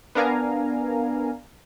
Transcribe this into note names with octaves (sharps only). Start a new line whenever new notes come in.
B3 D4 A#4 F5 G#5 A#5